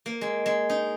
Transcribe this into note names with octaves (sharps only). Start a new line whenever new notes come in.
A#3
G#3
G#3
D#4